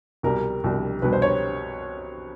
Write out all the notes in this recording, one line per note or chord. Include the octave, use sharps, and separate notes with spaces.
C2 B2 G3 A#4
C2 B2 G3
C2 B2 G3 B4
C5
C#5